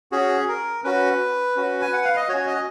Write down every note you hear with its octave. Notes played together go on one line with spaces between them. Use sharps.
C#4 F#4 G#4
A#4
C#4 F#4 B4
C#4 F#4
G#5
F#5
F5
D#5
C#4 F#4 C#5
D#5